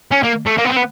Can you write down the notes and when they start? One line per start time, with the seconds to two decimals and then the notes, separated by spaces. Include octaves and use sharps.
0.11 C#4
0.23 A#3
0.46 A3
0.58 A#3
0.65 B3
0.69 C4
0.76 B3